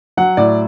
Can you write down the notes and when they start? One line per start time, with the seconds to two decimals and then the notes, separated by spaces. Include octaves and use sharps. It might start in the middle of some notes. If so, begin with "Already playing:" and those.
0.17 F#3 F#5
0.37 A2 D5